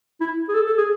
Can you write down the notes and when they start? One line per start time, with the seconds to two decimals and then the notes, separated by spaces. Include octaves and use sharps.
0.21 E4
0.49 G#4
0.54 A4
0.67 A4
0.78 G#4